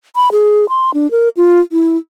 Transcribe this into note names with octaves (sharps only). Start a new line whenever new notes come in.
B5
G#4
C6
D4
A#4
F4
E4